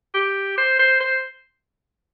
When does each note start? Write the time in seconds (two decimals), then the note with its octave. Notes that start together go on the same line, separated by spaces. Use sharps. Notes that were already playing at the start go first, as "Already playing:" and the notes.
0.14 G4
0.58 C5
0.79 C5
1.00 C5